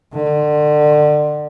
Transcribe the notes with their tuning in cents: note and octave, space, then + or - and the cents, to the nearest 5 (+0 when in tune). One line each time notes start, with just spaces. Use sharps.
D3 +30